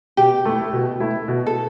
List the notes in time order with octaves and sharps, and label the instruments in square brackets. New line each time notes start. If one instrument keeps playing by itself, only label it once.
[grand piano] B2 [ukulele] G4
[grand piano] A3 E4
B2
A3 E4
B2
[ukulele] A4